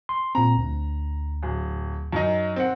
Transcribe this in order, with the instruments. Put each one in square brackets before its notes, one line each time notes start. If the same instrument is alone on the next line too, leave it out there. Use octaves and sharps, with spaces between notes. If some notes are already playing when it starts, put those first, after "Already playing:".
[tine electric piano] C6
[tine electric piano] A#2 C4 [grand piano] A#5
[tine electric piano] D2
[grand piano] D1
F#2 D#4
C4 F#5